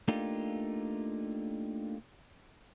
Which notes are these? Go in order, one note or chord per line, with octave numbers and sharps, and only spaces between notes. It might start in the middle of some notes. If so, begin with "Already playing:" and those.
A3 A#3 D4 D#4 F4 G4